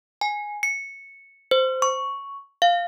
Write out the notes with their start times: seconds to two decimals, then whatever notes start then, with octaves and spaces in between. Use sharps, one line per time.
0.21 G#5
0.63 C#7
1.51 C5
1.82 C#6
2.62 F5